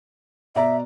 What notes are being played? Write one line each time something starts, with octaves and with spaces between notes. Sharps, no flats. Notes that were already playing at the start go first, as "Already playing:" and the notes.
B2 D5 E5 A#5